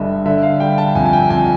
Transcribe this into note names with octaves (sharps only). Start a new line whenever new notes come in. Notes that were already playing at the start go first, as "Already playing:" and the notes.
Already playing: G1 G2 D3 G3 D#5 E5
D3 E5
F5
G3 G5
A5
F2 G#5
G#5
G5
F2 G#5